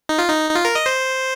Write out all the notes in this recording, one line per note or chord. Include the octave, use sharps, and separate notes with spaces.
D#4
F4
D#4
D#4
F4
A#4
D#5
C5